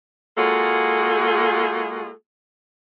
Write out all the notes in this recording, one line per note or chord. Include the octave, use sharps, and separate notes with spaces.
G#3 A#3 F4 F#4 G#4 A4